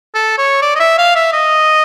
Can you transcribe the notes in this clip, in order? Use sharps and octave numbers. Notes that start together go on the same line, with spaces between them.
A4
C#5
D5
D#5
E5
F5
E5
D#5